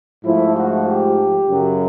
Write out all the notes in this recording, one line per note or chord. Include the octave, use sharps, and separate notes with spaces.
G#2 F3 A3 E4
F#4
G4
F#2 C#3 F#3